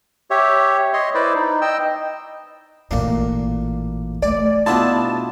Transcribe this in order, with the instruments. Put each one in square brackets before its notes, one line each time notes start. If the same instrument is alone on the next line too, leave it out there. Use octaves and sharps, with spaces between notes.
[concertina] G4 C#5 E5
C#5 D#5 C6
E4 B4 C5 D5
D#4
D#5 G5 E6
[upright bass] A1 A#2 [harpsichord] A#3 D4
[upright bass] A3 [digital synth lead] D5 [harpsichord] G#5
[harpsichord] B2 B3 G#4 [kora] D4 E4 F4 [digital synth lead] A5